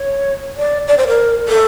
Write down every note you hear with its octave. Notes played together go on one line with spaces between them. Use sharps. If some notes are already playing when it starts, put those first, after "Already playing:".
Already playing: C#5
D5
D5
C5
A#4
A4